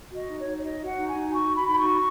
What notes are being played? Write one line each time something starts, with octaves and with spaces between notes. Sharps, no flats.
F#4
D#5
D#4
C#5
D#4
C#5
F#4 D#5
F#4
F#5
D#4
G#5
D#4
F#4 C#6
F#4
B5
D#4 B5
C#6
F#4